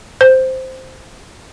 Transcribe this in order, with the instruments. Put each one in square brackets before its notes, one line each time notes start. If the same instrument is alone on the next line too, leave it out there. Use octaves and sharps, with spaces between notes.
[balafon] C5